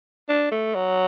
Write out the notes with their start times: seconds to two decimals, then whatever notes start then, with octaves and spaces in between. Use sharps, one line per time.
0.29 D4
0.51 A3
0.75 F#3